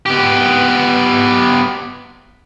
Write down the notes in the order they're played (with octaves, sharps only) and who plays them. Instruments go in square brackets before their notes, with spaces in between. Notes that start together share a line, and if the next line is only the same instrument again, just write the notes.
[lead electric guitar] B3 G4